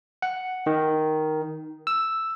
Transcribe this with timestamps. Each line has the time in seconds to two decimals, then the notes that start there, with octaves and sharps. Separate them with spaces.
0.22 F#5
0.66 D#3
1.87 E6